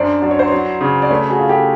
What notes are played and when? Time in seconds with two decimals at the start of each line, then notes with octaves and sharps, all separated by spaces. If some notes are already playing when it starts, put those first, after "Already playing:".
Already playing: F#2 D4 C5 D5
0.22 F#3 D5
0.31 C#5
0.39 C5
0.48 F#3 B4 C#5
0.81 C#3
1.02 D5
1.10 A3 B4 C#5
1.29 F#4 G#4
1.39 F4
1.49 G4 A4